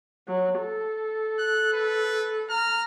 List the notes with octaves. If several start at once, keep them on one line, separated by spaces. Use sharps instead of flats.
F#3
A4
F#6
B4
A#5 F6